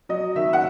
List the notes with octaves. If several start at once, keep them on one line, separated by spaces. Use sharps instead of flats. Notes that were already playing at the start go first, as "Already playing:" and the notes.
F#3 D#5
D#3 E5
F#5